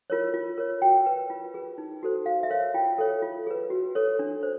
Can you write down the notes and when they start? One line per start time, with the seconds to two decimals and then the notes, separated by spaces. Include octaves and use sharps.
0.10 F4 A#4 C#5
0.34 F4
0.58 A#4 C#5
0.82 F#4 G5
1.06 B4
1.30 F4
1.54 G#4 B4
1.78 D#4
2.03 F#4 A4 C5
2.26 F#4 F5
2.43 E5
2.50 A#4 C#5 F5
2.74 F4 G5
2.98 A4 C#5
3.22 F4
3.47 G#4 B4
3.70 F#4
3.95 A4 C#5
4.19 D4
4.43 C5